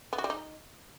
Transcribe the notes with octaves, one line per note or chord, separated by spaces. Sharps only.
B3
F#4
G3
D#4